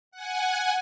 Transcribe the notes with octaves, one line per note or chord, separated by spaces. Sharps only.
F#5 G#5